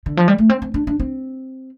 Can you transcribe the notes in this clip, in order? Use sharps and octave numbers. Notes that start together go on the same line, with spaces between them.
D3
F3
G3
A3
C4
C4
D4
D4
C4